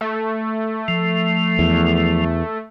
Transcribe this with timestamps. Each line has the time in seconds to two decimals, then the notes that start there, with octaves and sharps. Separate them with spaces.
0.01 A3
0.88 F3
1.59 E2